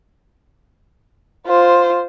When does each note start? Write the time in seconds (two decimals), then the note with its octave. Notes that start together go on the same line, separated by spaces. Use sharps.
1.46 F4 C5